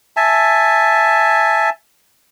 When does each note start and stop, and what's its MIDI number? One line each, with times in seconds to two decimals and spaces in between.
0.17 1.70 76
0.17 1.70 80
0.17 1.70 81